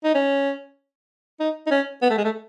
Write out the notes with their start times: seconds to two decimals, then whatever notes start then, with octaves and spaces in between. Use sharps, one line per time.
0.04 D#4
0.15 C#4
1.40 D#4
1.67 D#4
1.71 C#4
2.02 B3
2.10 A3
2.18 G#3
2.25 A3